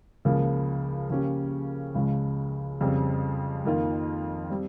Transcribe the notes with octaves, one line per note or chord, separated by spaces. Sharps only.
C#2 C#3 F3 A#3
C#3 F3 A#3 C#4 G4
C#2 C#3 F3 G#3
F2 C#3 G3 C4
F2 D#3 A#3 F4
G3 C4